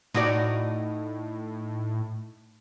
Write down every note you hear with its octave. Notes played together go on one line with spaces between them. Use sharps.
A2 D#4 F#4 D5